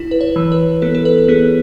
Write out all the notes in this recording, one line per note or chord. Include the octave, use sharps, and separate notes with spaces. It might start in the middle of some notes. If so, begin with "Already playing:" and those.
Already playing: E4
B4
C#5
E3
B4
B3 A4
A4
B4
B3 G#4